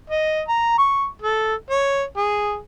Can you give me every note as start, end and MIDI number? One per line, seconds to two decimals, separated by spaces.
0.10 0.42 75
0.48 0.75 82
0.78 1.06 85
1.22 1.54 69
1.70 2.03 73
2.17 2.59 68